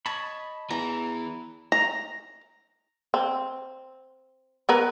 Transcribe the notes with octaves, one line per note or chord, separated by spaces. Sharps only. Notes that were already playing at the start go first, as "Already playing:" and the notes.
C#5 D#5 A5 B5
E2 E3 A#5
A#5
C4
B3 A#4 B4